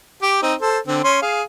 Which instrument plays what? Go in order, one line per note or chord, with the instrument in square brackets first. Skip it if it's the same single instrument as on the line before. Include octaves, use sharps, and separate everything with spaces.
[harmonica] G4 G5
C4 D#4
A4 C5
D3 C4
C#4 C6
G#4 F5